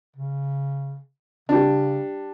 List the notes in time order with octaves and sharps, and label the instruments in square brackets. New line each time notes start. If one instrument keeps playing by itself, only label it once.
[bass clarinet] C#3
[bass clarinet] C#3 [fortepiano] G3 D4